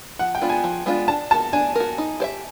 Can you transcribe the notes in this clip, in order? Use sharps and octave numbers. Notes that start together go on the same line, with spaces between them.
F3 F#5
G5
G#3 B3 D4 F4
G#5
F3
G#3 B3 D4 F4
D4 A5
F#4 A#4 A5
D4 G#5
F#4 A#4
D#4
G4 C5 E5